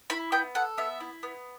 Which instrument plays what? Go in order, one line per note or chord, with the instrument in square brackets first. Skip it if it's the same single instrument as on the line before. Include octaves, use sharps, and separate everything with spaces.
[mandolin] E4 B5
B3 G5
A4 F#5
B3 E5
E4
B3